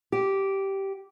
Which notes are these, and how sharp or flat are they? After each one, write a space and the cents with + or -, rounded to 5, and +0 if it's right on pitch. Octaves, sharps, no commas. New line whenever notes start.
G4 -10